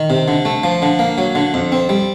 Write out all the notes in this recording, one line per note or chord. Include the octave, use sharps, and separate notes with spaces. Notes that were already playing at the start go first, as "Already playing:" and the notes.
Already playing: D#3
C3
D3
A3
F3
D3
A#3
F#3
D3
F2
C4
G3